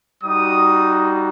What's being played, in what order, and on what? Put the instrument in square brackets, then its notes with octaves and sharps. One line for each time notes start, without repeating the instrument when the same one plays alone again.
[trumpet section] G3 D#4 F#4 D#6